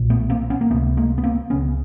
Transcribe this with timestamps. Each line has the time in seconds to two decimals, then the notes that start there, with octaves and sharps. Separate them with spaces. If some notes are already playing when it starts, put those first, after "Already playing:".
Already playing: B1 A#2
0.10 A3 B3
0.30 A#3 C4
0.50 B3 C#4
0.61 A#3
0.70 C#2 A3 B3
0.74 C3
0.97 G#3 A#3
1.18 B3
1.23 A#3 C4
1.50 C#2 C#3 B3 C#4